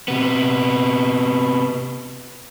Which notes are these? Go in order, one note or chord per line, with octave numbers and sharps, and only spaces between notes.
C3 B3